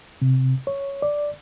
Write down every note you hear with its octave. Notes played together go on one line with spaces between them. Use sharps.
C3
C#5
D5